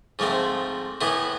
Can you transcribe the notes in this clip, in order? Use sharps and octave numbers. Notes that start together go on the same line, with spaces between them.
G#2 F3 A3 C4
A2 E3 B3 E4